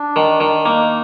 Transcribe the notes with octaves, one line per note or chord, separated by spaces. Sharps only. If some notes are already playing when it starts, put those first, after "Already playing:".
Already playing: D4
D#3
D#3
A#3 D#4